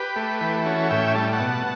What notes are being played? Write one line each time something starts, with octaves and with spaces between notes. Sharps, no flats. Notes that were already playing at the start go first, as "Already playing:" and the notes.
Already playing: G4 B4
A3
E3
C#4 F#4 A4
A2 E5 G5
G3 A5
F#5 A5
B2